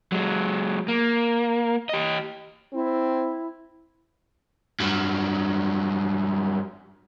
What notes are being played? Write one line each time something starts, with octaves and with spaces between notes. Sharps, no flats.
F#3 G#3
A#3
G4 D#5
C4 E4
G2 F#3